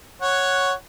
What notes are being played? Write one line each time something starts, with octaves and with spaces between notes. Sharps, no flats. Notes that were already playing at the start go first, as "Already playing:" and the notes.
C#5 F#5